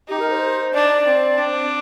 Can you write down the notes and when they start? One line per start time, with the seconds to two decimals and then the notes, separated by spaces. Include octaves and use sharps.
0.08 D#4 G4
0.19 A#4
0.30 C5
0.73 D4 D5
1.06 C4
1.38 D4